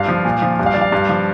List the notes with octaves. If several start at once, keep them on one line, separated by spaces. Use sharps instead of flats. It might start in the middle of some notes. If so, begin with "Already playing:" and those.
Already playing: G2 F5
F3
A#2
F3
G2
F5
F3 D5
F5
G2
F3